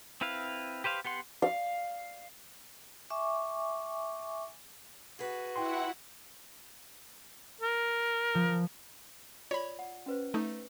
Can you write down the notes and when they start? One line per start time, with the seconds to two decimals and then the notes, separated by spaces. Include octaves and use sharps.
0.21 C4 E4 B4 F5
0.84 G4 B4 C5 F5
1.05 B3 G4 F#5 C6
1.42 F5
3.10 E5 G#5 C#6 D6
5.19 F#4 G#4 B4
5.56 E4 F#5 G5 C6
7.61 A#4
8.35 F3
9.51 F4 C#5 D5 B5
9.79 F#5
10.06 C#4 B4 C5
10.34 A3 D#4